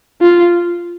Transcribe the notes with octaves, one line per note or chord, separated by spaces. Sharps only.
F4